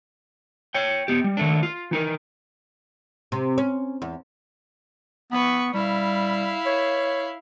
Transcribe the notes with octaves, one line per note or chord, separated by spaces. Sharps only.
C#5 G5
B3 G4
G3
D#3 A3 D4
F4
E3 D#4 A#4
C3
C#4
E2
B3 B4 C#6
G3 E4 F5
C#5